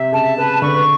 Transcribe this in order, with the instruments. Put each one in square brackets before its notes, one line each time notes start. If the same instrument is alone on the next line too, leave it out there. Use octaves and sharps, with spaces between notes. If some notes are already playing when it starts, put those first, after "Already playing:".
Already playing: [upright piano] C3 [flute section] E5
[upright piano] C#3 [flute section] A5
[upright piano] C#3 [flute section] B4
[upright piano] D3 [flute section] C#6